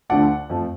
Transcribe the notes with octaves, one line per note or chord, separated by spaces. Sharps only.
D2 D3 F3 A3 D5 F#5
F2 F3 A3